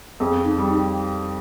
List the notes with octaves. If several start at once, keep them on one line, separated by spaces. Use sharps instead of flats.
F2 G#4
D#4
G3
D#4